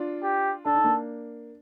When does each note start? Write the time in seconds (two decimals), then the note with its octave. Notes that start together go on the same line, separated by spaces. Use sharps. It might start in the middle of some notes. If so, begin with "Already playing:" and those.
Already playing: D4 F4
0.23 G4
0.66 D4 A4
0.75 D#4
0.84 A#3 D4